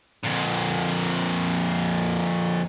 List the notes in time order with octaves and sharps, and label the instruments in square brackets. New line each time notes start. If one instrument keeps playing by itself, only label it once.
[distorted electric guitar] F2 A#2